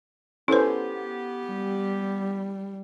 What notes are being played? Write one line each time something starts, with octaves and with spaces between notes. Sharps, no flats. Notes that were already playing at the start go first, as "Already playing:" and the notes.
B3 C#4 E4 G4 A4 B4 C5
G3